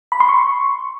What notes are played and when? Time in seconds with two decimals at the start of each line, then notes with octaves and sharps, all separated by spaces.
0.12 B5
0.20 C6
0.29 C#6